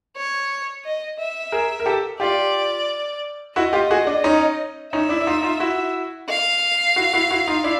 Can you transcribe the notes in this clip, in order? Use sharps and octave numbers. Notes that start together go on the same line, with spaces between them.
C#5
D#5
E5
G#4 A#4
A#4
G4 A4
F4 G4 D5
E4 F#4 D#5
F4 G4
F#4 G#4
D4
C#4 D#4
C#4 D#4 E5
D4 E4
E4
D#4 F4
D#4 F4
E4 F#4
F5
E4 F#4
E4 F#4
E4 F#4
D#4 F4
D4 E4